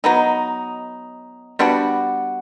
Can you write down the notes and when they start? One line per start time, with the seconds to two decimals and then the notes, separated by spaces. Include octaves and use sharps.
0.04 F#3 B3 D#4
1.59 G3 B3 D4 F#4